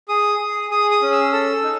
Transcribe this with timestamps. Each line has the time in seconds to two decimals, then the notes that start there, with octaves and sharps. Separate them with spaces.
0.09 G#4 D#6
0.39 G#4
0.71 G#4 D#6
0.91 D#6
1.02 C#4
1.12 E6
1.32 A4 E6
1.64 D#4